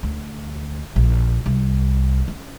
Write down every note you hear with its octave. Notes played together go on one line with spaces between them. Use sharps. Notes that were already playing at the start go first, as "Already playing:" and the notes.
D2
A#1
C2
C#4